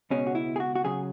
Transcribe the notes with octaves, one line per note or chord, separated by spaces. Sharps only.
C#2 B2 G#3 C#4
F#4
E4
G#4
F#4
F#4
C#3 F#3 G#4